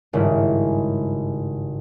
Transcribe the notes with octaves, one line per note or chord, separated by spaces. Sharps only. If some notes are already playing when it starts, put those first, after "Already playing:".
G#1 G2 C#3 E4 F4